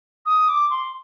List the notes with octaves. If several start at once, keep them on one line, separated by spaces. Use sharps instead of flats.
D#6
D6
C6